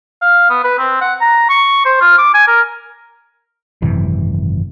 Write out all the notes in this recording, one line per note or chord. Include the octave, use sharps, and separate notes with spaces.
F5
B3
B4
C4
F#5
A#5
C#6
C5
F4
D6
G#5
A#4
G#1 F#2 C3 E3